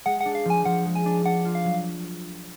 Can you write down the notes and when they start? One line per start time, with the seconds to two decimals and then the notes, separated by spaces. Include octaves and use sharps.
0.06 G#3 F#5
0.21 D4 F#5
0.35 F5
0.45 F3 G#5
0.65 F3 F#5
0.85 G#3
0.95 G#5
1.05 D4
1.25 D4 F#5
1.45 F4
1.55 F5
1.65 F#3